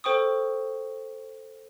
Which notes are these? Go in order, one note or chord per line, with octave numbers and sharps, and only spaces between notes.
A4 C5 G5 C#6 D#6